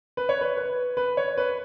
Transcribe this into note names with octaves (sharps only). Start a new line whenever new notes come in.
B4
C#5
B4
B4
B4
C#5
B4